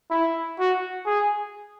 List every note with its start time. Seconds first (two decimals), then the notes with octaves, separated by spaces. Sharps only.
0.11 E4
0.59 F#4
1.06 G#4